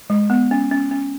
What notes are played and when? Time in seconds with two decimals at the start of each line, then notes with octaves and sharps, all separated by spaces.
0.10 G#3
0.30 B3
0.51 C#4
0.72 C#4
0.91 C#4